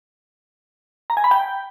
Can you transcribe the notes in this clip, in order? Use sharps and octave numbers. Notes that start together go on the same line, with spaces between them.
A#5
G#5
B5
G5